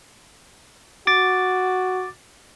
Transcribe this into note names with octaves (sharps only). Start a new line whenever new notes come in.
F#4 D6 A6